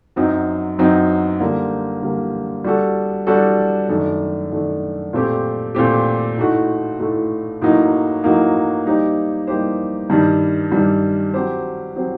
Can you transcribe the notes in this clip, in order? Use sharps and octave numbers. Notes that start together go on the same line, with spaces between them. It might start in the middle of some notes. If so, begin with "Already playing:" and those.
F#2 F#3 C4 D#4
F#2 F#3 C4 D#4
D3 G3 A#3
D3 G3 A#3
G3 D4 F#4 A4
G3 D4 F#4 A4
F#2 D#3 A3 D4
F#2 D#3 A3 D4
A#2 A3 C4 G4
A#2 A3 C4 G4
A2 A3 D#4 F#4
A2 A3 D#4 F#4
A2 F#3 A#3 D#4
A2 F#3 A#3 D#4
G3 A#3 D#4 G4 C5
G3 A#3 D#4 G4 C5
G2 D#3 G3
G2 D#3 G3
F#3 C4 G4 C5
F#3 C4 G4 C5